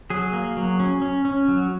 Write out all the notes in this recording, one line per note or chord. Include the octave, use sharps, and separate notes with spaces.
F#3 G#4
A#3
F#3
C#4
C#4
C#4
F#3